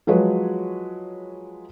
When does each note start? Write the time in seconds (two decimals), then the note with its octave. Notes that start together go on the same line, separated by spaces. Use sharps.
0.07 F3 F#3 G#3 B4 C#5